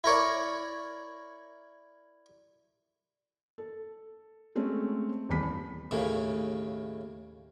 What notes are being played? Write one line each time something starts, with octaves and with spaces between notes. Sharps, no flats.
E4 A#4 C#5 D5
A4
G#3 A3 C4 C#4
D#1 E2 B5 B6
D#2 A2 C#3 A#3